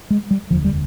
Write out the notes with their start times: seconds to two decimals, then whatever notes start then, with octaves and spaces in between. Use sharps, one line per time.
0.11 G#3
0.31 G3
0.50 F1 D#2 D3 F3
0.65 G3